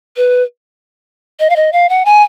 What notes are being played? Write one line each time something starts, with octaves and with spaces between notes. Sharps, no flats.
B4
D#5
F5
D#5
F5
F#5
G#5